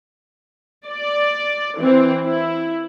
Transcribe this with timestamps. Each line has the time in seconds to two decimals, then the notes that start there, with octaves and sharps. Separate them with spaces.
0.86 D5
1.79 E3 C4
2.25 E4